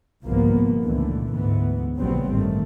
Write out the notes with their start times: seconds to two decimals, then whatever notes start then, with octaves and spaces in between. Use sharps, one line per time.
0.25 G1 C2 G#2 F3 A#3 B3
0.84 C#2 A#2 D3 E3 A3
1.34 D2 G#2 E3 B3
1.98 A#1 C#3 F#3 G3 B3 C4
2.31 A1 G2 D#3 A3